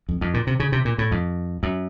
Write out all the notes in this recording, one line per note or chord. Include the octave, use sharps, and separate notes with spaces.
F2
F2
A#2
C3
C#3
C3
A#2
A2
F2
F#2